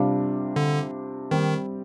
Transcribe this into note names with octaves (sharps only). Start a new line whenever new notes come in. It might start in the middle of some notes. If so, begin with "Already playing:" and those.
Already playing: C3 G3 D4 F4
D3
D#3 G3 C4 G4